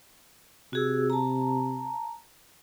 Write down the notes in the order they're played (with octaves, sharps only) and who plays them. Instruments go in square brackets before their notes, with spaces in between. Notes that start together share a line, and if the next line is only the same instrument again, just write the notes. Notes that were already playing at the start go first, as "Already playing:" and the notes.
[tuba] C3 [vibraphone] F#4 G#4 E6
[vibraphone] A5 A#5